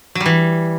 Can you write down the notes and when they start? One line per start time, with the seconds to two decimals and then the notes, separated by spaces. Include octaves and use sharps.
0.15 F#3
0.21 G3
0.26 E3